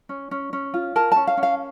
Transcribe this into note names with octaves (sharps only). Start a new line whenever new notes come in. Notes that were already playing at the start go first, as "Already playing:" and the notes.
C#4
C#4
C#4
F4
A#4 A5
C#4 A5
F5
C#4
F5